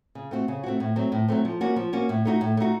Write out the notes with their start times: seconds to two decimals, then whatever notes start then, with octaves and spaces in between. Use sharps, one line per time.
0.15 C#3
0.31 A3 C4 F#4
0.48 C#3
0.64 A3 C4 F#4
0.80 A2
0.96 F#3 A3 C4
1.12 A2
1.28 F#3 A3 C4
1.45 F3
1.61 A#3 C#4 F#4
1.76 F3
1.93 A#3 C#4 F#4
2.09 A2
2.25 A3 D#4 F#4
2.41 A2
2.57 A3 D#4 F#4